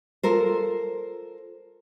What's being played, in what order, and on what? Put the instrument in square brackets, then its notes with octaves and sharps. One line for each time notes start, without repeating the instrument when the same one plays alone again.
[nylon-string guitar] F4 A4 A#4 C5